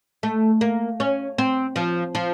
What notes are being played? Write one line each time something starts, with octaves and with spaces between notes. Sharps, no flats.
A3
A#3
C#4
C4
F3
F3